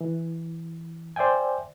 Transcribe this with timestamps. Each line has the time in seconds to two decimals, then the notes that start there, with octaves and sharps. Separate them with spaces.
0.01 E3
1.16 C5 D5 E5 G5 G#5